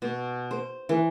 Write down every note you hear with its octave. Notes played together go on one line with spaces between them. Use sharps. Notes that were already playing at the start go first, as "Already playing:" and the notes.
B2
C5
E3